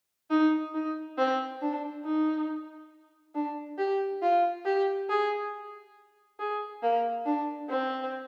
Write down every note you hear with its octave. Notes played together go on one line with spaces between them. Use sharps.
D#4
D#4
C4
D4
D#4
D4
G4
F4
G4
G#4
G#4
A#3
D4
C4